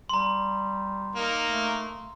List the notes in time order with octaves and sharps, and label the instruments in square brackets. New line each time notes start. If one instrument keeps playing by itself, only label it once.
[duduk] G3 [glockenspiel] A#5 C6
[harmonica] A#3 D#4
[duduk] A3